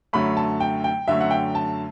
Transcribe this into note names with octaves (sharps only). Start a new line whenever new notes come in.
F#2 D3 F#3 A3 B5
A5
G5
G5
F#2 D3 F#3 A3 E5
F#5
G5
A5